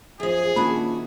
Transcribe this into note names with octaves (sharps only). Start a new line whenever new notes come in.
F#2 F3 G#4
A#2 D#3 C#4 D4 E4 F#4 B5